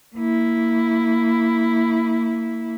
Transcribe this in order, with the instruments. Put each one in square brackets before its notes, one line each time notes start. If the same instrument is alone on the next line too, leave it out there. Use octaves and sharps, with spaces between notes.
[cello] A#3 E4